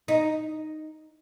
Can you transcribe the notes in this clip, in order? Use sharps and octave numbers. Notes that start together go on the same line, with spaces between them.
D#4